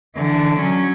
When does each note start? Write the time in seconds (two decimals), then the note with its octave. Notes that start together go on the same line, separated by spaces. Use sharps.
0.16 D3 E3
0.60 F#3 C#4